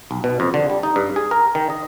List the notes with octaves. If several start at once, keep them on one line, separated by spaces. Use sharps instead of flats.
B1
B2
F2
D3
G3
D#4
G2
G#4
A#4
D#3
D#5